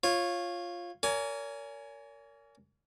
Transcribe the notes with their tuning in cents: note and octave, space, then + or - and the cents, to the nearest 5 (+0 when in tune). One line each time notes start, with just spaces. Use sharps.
F4 +0 C#5 -15
A#4 -15 C#5 +45 G#5 +10